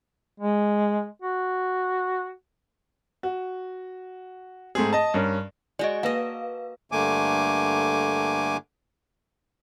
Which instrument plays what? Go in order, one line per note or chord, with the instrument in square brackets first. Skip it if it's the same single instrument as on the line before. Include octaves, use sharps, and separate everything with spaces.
[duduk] G#3
F#4
[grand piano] F#4
G#2 A3 C4 G#4
D#5 A5
G2 C#4 A#4
[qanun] G#3 F#4 [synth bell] D5 D#5
[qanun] A#3 D#5 [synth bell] B4 F5
[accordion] G2 D3 A3 A#3 G#5 D6